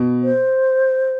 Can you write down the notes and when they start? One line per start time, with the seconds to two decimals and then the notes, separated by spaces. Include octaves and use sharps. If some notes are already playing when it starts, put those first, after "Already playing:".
Already playing: B2
0.23 C5